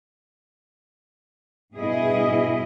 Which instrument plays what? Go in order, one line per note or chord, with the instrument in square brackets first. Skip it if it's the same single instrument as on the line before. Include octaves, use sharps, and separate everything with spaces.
[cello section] G2 B2 E4 G#4 D#5